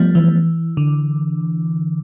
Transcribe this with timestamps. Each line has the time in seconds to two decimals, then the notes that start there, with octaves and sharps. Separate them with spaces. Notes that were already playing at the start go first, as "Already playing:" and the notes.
Already playing: F3 G3 A3 B3
0.15 E3
0.77 D3